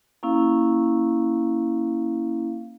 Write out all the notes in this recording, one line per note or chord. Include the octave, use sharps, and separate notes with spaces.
A#3 C#4 E4 F5